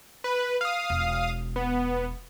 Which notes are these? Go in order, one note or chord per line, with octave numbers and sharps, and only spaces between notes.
B4
F5 D#6
E1
B3